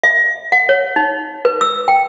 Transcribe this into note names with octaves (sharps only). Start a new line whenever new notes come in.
E5
F#5
C#5
D#4
B4
E6
G5